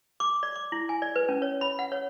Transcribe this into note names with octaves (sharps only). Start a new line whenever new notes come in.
D6
D5
D6
E4
G#5
D5
B4
C#4
C#5
B5
F#5
C#5